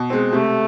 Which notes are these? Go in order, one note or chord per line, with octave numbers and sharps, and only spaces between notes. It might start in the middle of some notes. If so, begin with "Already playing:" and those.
Already playing: B2
G#3 C4
C3 A3